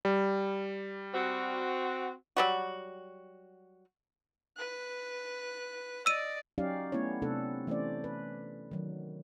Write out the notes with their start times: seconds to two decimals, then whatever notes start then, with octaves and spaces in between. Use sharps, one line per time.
0.05 G3
1.13 C4 F#4
2.37 F#3 G3 F#4
4.57 B4 F#6
6.06 D5 D#5 E6 D#7
6.58 F#3 C#4 D#4 G4 D5 F5
6.92 A3 B3 C#4 E4 C#5
7.22 C3 A3 C4 D4 A4 F#5
7.67 E3 A3 C#4 C5 D5
8.04 B4
8.71 D#3 F#3